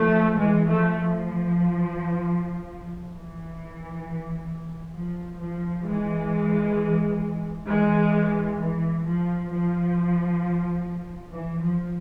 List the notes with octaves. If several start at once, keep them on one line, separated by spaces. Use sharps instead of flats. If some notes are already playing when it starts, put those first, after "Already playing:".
Already playing: F3 A3
E3 G#3
F3 A3
F3
E3
F3
F3
E3 G#3
E3 G#3
E3
F3
F3
E3
F3